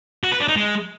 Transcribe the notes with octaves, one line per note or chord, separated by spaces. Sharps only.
F#4
B4
D4
D#4
G#3